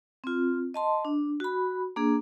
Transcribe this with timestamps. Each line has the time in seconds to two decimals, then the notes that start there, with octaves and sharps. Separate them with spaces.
0.24 C4 F4
0.74 D#5 A5 C6
1.05 D4
1.40 F#4 B5
1.96 A#3 D4 G#4